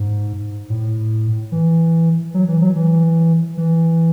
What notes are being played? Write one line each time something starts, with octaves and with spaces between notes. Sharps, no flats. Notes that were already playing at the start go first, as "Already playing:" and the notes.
Already playing: G#2
A2
E3
F#3
E3
F#3
E3
E3